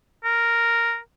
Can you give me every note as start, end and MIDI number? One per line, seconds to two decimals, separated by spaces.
0.25 0.98 70